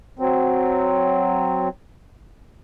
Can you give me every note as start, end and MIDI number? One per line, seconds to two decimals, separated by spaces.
0.19 1.69 54
0.19 1.69 60